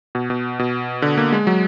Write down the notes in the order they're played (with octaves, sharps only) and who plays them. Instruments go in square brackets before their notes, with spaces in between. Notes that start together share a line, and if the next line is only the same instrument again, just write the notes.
[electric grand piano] B2
B2
B2
D3
A#3
G#3
F#3